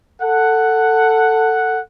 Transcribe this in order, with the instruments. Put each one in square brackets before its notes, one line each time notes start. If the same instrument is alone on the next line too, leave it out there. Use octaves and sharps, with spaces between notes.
[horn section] A4 F#5